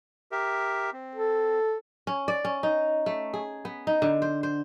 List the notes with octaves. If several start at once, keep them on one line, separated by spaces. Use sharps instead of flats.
G4 A#4 E5
C4
A4
C#4
D5
C#4
D#4
A3
G#4
B3
D#4
D3
C5
C5